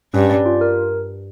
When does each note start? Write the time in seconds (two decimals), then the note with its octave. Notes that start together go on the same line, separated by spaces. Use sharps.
0.14 G2 C#4
0.29 D5
0.46 F4
0.61 A#4